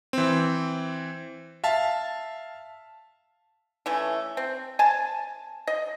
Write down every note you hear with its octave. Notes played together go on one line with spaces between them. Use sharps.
E3 C4
E5 F5 A5
E3 A3 C#4
C4
G#5 A5
D#5